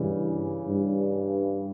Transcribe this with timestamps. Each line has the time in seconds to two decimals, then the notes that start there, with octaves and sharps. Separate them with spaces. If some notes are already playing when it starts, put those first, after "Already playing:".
Already playing: G2 C#3 E3
0.66 G2